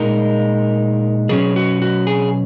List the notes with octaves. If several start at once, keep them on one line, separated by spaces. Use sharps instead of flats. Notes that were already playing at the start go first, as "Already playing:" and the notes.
Already playing: A#2 G#3 D#4 A#4
B2 F#3 C#4 G#4
F#4
F#4
G#4